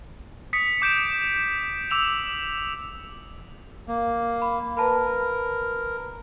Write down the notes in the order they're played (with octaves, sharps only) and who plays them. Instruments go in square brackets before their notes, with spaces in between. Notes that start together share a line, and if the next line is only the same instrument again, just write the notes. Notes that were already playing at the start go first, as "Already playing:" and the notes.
[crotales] D#6 B6 C#7
D6 G6 D7 E7
D6 E6 F7
[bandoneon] A#3
[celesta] B5
[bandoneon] A#4 [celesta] B4 A5 B5